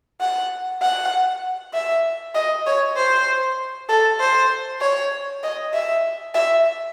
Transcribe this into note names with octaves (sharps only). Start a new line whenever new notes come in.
F#5
F#5
E5
D#5
C#5
C5
A4
C5
C#5
D#5
E5
E5